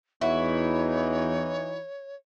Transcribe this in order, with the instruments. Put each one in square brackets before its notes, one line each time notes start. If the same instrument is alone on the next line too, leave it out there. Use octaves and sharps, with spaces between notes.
[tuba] E2 [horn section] E3 D#4 [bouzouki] E4 F#4 [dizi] C#5